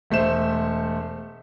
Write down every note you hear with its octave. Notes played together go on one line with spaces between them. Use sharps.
E1 A3 C5 E7